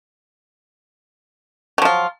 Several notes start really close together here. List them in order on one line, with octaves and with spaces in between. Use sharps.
F#3 F3 F4